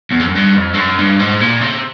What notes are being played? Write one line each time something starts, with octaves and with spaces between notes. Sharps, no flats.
E2
F2
F#2
G2
F2
G2
F#2
G2
G#2
A#2
C3